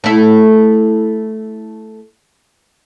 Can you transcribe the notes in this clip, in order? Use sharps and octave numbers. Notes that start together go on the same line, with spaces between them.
A3 E4